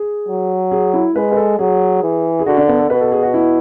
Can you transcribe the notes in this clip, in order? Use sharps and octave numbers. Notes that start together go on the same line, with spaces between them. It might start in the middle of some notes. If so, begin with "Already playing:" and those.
Already playing: G#4
F#3
G#4
E4
G#3 B4
B4
A4
F#3 G#4
E3
G#4
D3 F#4
D4
B3
A4
B2 B4
A4
G#4
F#4
E4